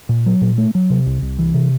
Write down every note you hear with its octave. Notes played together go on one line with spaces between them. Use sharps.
A#2
F#3
A#2
A3
F#3
C3
C2
C2
E3
C3